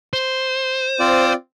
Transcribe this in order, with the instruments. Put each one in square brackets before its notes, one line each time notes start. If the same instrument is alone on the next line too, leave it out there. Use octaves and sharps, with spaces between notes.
[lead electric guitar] C5
[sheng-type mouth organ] C4 F4 D5